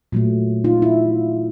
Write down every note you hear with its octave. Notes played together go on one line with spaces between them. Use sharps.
A#2 F#3 A3
D#4 F4
E4